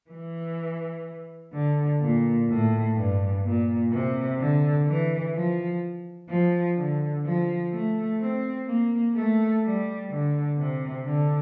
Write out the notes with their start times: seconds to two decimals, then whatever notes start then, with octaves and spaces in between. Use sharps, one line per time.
0.10 E3
1.53 D3
2.01 A#2
2.49 A2
2.96 G2
3.44 A#2
3.92 C3
4.39 D3
4.86 E3
5.34 F3
6.29 F3
6.76 D3
7.24 F3
7.72 A3
8.20 C4
8.66 A#3
9.14 A3
9.62 G3
10.10 D3
10.58 C3
11.05 D3